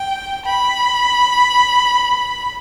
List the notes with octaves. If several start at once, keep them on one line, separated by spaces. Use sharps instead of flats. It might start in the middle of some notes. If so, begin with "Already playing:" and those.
Already playing: G5
B5